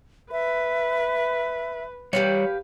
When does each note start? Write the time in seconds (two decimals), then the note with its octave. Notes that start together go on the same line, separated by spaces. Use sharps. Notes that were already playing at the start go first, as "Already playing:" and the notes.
0.32 B4 E5
2.13 G3 G4 B4 C#5 F5